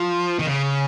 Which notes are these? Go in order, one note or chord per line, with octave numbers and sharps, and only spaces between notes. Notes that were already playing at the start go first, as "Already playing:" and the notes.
Already playing: F3
D#3
C#3